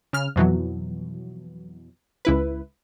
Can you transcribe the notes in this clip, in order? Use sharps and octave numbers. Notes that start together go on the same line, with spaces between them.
C#3 F6
F2 B2 E3 F#3
C#2 E4 B4